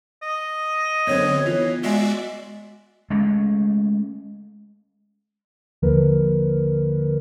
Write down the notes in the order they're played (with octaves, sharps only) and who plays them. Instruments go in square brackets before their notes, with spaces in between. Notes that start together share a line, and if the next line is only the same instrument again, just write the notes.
[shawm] D#5
[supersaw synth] F#2 D3 C4 [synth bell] B3 D#6 A#6 [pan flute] C#5
[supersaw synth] E3 [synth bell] B3 F4
[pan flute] G#3 [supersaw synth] F#4 D5 E5 [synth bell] G#5 C7 G7
[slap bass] G#3 A3 C#4
[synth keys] D#2 D3 F3 A#3 A#4 B4